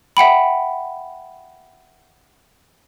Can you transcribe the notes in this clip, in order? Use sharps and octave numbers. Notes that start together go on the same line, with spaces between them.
E5 F#5 G5 B5